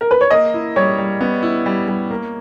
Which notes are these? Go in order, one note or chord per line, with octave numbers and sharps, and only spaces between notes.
A#4
B4
C#5
A#3 D#5
E4
G3 C#5
G3
B3
E4
G3
G3
A#3